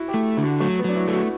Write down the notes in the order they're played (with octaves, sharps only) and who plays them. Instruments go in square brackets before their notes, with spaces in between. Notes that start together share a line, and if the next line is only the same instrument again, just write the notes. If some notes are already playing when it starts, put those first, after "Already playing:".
Already playing: [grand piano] E4 F#4
G4
[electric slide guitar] A3
D3
[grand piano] F#4
[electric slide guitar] F#3 [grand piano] A3
[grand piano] B3
[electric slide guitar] F#3 [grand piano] D4
[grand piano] E4
[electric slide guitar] A3
[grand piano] F#4